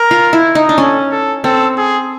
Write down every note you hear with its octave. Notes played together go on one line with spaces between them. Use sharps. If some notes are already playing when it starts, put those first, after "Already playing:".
Already playing: A#4
F4
E4
D#4
D4
C#4 A4
A4
C4 A4
G#4